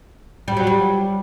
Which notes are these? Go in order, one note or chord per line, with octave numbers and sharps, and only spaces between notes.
G3
F#3
G3